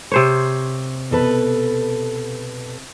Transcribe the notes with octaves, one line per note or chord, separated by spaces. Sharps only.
C3 C5 C#5
B2 A4 B4